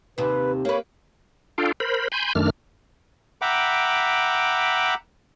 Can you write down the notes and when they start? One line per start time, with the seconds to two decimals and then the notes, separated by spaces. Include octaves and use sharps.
0.18 D#2 C3 B4
0.65 A#3 B4 C#5
1.58 D4 F4 A4 F5 G5
1.80 A#4 C5 B5
2.12 G#5 B5 C6 G6
2.35 F#2 D#3 A3 D4 F6
3.42 E5 F#5 G5 A#5 B5 D6